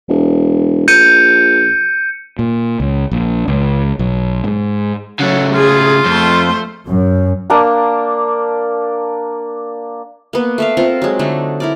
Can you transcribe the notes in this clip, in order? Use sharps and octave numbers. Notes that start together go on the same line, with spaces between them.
E1
A#1 G6 C#7 D#7
A#2
C#2
A#1
C#2
B1
G#2
C#3 F#3 A3 F#5
F4 G#4
F2 A3 C5
F#2
A#3 D4 A5 A#5
A#3 B3
A3 E5 F5
C4 F4 A4 A#4
F#3 G#3
D3 A3 D4 D#4
E4 A#4 D5